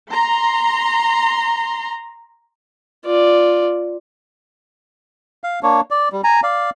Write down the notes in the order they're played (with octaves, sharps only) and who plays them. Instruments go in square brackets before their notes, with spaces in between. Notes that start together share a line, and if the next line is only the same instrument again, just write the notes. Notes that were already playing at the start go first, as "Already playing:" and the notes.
[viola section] A#5 C6
[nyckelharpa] F4 D5
[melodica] F5
A#3 D4 C#5
D5
G3
G#5 A#5
D5 F5